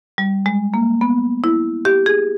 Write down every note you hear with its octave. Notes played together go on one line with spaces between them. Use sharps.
G3
G#3
A#3
B3
E4
G4
G#4